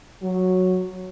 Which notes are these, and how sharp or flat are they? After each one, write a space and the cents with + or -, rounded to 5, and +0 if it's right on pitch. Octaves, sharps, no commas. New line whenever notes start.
F#3 -5